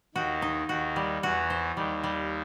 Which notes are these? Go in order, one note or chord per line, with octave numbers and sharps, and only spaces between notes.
D#2 D#3 F#4
D#4
D#2 D#3 F#4
G3
E2 E3 F#4
C5
D#2 D#3 G3
G3